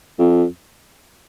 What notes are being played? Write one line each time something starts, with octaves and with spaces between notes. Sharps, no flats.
F2